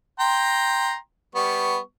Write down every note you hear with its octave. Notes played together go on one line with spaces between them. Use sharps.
G5 A#5 C6
G3 B3 C#6